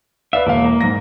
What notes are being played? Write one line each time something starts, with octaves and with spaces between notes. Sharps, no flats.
B4 D5 E5 F5
E1 A#3 F5
A#5
G#2 A#6